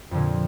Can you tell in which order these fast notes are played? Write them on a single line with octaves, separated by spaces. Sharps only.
F2 D3 A#2